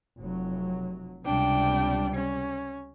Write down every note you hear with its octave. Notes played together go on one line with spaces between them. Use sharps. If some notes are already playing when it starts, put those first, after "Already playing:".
F1 F#3
C#2 C3 G3 D4 G5
C#4